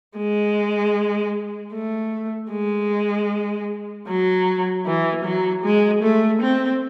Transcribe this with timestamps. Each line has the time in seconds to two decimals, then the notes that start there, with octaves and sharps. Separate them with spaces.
0.16 G#3
1.73 A3
2.51 G#3
4.07 F#3
4.86 E3
5.24 F#3
5.64 G#3
6.03 A3
6.42 C4